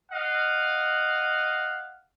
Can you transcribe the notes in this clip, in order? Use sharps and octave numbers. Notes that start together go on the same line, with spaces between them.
D#5 F5 F#5